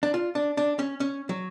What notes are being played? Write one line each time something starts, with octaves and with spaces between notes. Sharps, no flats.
D4
F4
D4
D4
C#4
C#4
F#3